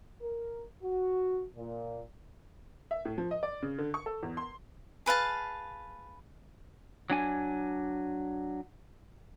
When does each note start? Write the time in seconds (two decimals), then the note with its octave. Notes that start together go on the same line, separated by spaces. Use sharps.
0.22 A#4
0.83 F#4
1.56 A#2
2.91 E5
3.05 A2
3.18 F3
3.31 D#5
3.43 D5
3.62 C#3
3.78 D3
3.94 C#6
4.06 A4
4.23 E2
4.37 C6
5.06 G#4 B4 F5 A5
7.10 F#3 D4 G#5